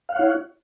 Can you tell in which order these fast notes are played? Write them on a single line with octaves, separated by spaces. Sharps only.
F5 F#5 C#5 E4